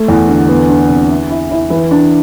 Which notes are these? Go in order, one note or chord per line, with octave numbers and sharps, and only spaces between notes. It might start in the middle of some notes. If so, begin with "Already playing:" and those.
Already playing: A3
E2
D3
B3
D4
C3
E4
E4
E4
E3
D4